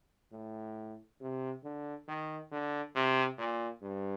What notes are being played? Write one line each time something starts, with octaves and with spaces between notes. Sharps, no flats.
A2
C3
D3
D#3
D3
C3
A#2
G2